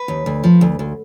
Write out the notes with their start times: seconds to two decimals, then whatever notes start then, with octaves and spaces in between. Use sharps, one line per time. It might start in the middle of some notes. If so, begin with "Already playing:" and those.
Already playing: B4
0.08 D#2
0.26 D2
0.44 F3
0.61 D2
0.79 D2